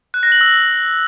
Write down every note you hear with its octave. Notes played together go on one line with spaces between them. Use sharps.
F#6
A#6
F#7
E6